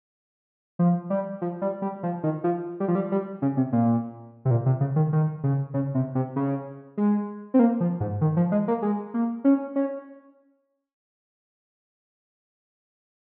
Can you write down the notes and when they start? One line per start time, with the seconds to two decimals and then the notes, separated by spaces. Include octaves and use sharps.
0.79 F3
1.10 G3
1.41 F3
1.62 G3
1.82 G3
2.03 F3
2.23 D#3
2.44 F3
2.80 G3
2.88 F3
2.95 G3
3.12 G3
3.42 C#3
3.57 C3
3.73 A#2
4.45 C3
4.51 A#2
4.66 C3
4.81 C#3
4.96 D#3
5.13 D#3
5.44 C#3
5.74 C#3
5.95 C3
6.15 C3
6.36 C#3
6.97 G#3
7.54 C4
7.59 A#3
7.80 F3
8.00 G#2
8.21 D#3
8.37 F3
8.52 G#3
8.68 A#3
8.82 G#3
9.14 A#3
9.44 C#4
9.76 C#4